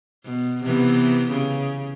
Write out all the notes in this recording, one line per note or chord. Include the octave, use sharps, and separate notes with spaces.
B2
C3 E3 B3
C#3